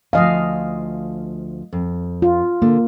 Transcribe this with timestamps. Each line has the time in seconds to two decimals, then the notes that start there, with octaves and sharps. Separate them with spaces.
0.13 D2 F3 D#5 F5 G#5
1.73 F2
2.22 F4
2.62 D3 A#3